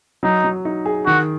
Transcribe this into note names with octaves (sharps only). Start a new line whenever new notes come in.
F#3 D#4
F#3
D#4
G#4
D#3 F#4